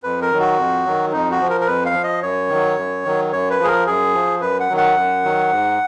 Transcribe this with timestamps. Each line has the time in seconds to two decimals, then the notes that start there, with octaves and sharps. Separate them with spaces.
0.03 F2 B4
0.22 A#4
0.31 D#3 F#3
0.40 F#4
0.58 F2
0.86 D#3 F#3
1.12 F2 D#4
1.31 F#4
1.40 F3
1.50 A#4
1.61 A#4
1.67 F2 B4
1.86 F5
1.94 F3
2.03 D#5
2.22 F#2 C#5
2.49 D#3 F#3
2.77 F#2
3.05 D#3 F#3
3.32 F#2 C#5
3.50 B4
3.59 F3
3.64 G#4
3.68 A#4
3.86 F#2 G#4
4.15 F3
4.41 F#2 B4
4.60 F#5
4.69 D#3 F#3
4.77 F#5
4.97 F#2
5.24 D#3 F#3
5.51 G#2